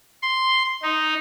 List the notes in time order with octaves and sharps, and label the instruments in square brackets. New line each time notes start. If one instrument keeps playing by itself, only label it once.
[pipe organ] C6
D#4